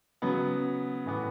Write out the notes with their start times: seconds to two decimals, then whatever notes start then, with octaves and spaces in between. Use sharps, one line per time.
0.22 C#3 F#3 B3
1.06 A2 E3 B3